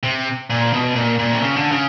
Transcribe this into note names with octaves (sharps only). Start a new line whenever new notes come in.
C3
A#2
B2
A#2
A#2
C3
C#3
D3
C#3